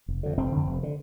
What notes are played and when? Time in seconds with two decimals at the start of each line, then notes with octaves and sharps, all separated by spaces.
0.08 F1
0.23 F2 D3
0.37 F1 C4
0.52 F2 D3
0.67 F1
0.83 D3